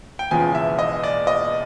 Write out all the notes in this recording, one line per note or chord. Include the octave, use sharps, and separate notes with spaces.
G5
E1 E2 C#3 F3 G#5
E5
D#5
D5
D#5